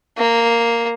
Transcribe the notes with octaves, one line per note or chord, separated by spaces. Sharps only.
A#3